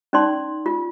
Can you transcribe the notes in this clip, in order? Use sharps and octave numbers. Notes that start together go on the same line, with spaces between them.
C#4 D#4 D5 C6
F4